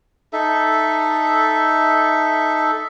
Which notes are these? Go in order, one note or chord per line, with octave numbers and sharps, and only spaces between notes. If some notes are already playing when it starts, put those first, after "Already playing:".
D#4 A4 E5